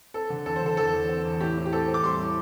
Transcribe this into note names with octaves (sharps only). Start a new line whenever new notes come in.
C4 A4
D3
E2 A4
C5
D3 A4
E2 A4
E2
C4
E2
A2 G4
A2
G4
C4 A4
C4
D6
G3 C6
A2